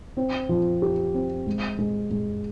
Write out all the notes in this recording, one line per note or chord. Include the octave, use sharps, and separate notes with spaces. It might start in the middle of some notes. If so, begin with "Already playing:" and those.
C4
F3
G4
C4
G#3
G#3
G#3